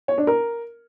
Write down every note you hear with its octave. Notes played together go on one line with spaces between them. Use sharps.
C#5
D4
A#4